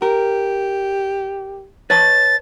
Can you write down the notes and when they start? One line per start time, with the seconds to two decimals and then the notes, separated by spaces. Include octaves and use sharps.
0.02 G4 A#4
1.90 B4 C#5 A5 A6